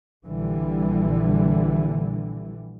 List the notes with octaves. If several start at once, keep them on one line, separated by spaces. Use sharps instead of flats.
A#1 D3 E3 G3